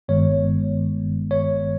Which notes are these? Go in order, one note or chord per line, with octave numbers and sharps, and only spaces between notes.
G1 G2 D#3 G#3 B3 C#5
C#5